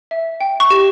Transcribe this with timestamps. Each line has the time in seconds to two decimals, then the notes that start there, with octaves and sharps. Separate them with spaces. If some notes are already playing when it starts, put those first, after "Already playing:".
0.11 E5
0.41 G5
0.60 C#6
0.70 G4